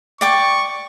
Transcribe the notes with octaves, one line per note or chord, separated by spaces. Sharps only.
D5 G5 C#6 D6